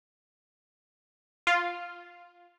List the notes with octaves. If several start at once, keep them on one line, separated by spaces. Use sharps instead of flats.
F4